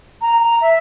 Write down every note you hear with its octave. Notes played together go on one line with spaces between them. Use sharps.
A#5
A#5
E5